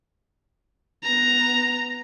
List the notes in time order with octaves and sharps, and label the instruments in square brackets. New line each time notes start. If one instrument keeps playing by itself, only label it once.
[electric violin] B3 A#5